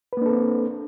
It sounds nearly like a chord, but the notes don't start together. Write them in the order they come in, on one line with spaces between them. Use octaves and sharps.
B4 A#3 D4 A4 C4